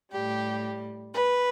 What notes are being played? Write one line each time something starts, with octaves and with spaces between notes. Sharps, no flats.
A2 G3 G4
B4